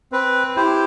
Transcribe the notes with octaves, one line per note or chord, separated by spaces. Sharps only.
C4 B4
E4 G4 C5